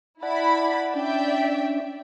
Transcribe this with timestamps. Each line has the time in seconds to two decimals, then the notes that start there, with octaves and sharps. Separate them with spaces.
0.22 E4 D5 F#5 A5 B5
0.94 C#4 D4 D5 E5 G5